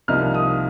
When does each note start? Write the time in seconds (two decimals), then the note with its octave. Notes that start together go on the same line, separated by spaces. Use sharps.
0.08 C2 C3 F3 A#3 D#4 F6
0.34 D#6